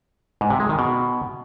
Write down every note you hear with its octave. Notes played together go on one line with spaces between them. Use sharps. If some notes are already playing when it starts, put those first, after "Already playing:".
G#2
C3
G#3
D#3
B2